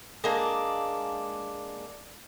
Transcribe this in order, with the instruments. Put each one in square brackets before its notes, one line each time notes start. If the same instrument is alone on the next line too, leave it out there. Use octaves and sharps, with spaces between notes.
[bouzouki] G#3 A#3 D4